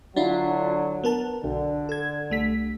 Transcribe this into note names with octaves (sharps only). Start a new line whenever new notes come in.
D3 F#3 D4 E4 F4
B3 A#4 A5
B1 D3
A4 G#6
C2 A3 B6